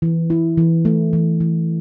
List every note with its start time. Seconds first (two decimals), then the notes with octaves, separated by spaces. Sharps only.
0.02 E3
0.30 E4
0.58 E3
0.85 A3
1.13 E3
1.40 E3